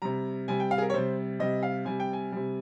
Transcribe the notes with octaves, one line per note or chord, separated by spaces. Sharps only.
C3 G3 A#5
C3 G3 G#5
G5
F5
G#4
A#4
C#5
C3 G3 C5
C3 G3 D#5
F5
C3 G3 G#5
G5
G#5
C3 G3